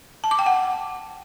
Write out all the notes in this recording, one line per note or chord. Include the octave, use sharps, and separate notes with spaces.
A5
D6
G5
F#5